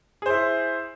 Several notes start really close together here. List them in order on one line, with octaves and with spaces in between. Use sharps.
G#4 C5 E4